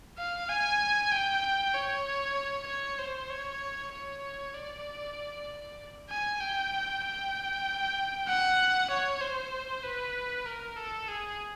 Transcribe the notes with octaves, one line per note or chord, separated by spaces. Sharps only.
F5
G#5
G5
C#5
C#5
C5
C#5
C#5
D5
G#5
G5
G5
F#5
C#5
C5
B4
A#4
A4
G#4